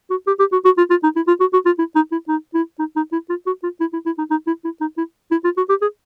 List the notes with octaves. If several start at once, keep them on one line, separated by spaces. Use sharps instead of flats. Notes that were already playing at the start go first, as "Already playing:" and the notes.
F#4
G4
G4
F#4
F#4
F4
F4
D#4
E4
F4
F#4
F#4
F4
E4
D#4
E4
D#4
E4
D#4
D#4
E4
F4
F#4
F4
E4
E4
E4
D#4
D#4
E4
E4
D#4
E4
E4
F4
F#4
G4
G#4